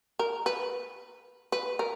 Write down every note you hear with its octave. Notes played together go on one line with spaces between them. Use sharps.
A#4
B4
B4
A#4